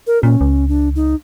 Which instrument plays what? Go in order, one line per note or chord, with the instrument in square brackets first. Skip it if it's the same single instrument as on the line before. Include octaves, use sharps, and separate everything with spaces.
[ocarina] A#4
[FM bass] A#2 [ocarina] C#4
[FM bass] C#2
[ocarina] D4
D#4